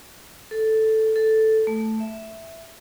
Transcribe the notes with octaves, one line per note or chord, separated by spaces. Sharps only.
A4
A4
A3
E5